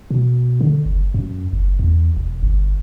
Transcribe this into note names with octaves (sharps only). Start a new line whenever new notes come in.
B2
D3
F#1
F#2
F#1
E2
E1
G1